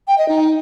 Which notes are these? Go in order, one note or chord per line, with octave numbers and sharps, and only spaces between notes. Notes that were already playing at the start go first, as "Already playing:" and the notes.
G5
D#5
D#4